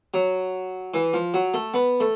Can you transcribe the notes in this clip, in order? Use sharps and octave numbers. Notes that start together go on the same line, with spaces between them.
F#3
E3
F3
F#3
A3
B3
A3